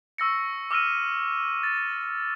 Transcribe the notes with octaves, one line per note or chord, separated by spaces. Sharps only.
C#6 E6 A#6 C#7
D6 E6 F6 A#6 D#7
A6